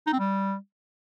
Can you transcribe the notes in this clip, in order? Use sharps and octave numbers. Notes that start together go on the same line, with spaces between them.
D#4
C4
G3